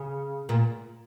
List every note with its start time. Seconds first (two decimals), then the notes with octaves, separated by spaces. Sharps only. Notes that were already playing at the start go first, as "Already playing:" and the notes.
Already playing: C#3
0.49 A#2